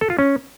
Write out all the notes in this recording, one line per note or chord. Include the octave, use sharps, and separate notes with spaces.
A4
F4
C#4